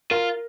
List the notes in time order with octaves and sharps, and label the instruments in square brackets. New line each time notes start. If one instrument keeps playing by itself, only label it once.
[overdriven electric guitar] F4 [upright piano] A#4